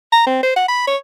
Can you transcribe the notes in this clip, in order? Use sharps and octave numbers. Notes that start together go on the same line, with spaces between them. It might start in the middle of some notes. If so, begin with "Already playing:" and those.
A#5
C4
C5
F#5
B5
C#5